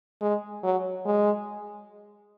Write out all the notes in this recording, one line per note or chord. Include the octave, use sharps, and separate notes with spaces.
G#3
F#3
G#3